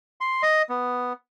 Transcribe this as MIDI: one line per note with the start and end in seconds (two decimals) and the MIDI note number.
0.21 0.42 84
0.43 0.62 75
0.69 1.13 59